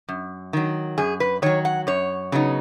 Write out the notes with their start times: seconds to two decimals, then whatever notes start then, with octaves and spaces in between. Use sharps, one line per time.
0.09 F#2
0.53 D#3 F#3
0.98 F#2 G#4
1.20 B4
1.42 D#3 F#3 C#5
1.65 F#5
1.87 F#2 C#5
2.32 C#3 F#3 B3 D#4